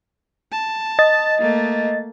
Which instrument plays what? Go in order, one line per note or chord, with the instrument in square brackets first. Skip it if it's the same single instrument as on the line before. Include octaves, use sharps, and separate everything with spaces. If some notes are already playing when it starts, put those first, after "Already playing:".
[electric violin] A5
[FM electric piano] D#5 A6
[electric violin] A3 A#3